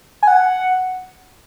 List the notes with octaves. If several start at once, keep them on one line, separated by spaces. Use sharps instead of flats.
G#5
F#5